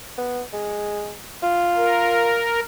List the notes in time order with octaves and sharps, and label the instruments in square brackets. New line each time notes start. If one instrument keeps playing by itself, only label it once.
[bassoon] B3
G#3
F4
[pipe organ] A#4